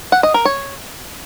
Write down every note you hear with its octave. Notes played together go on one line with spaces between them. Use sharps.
F#5
D#5
A#4
C#5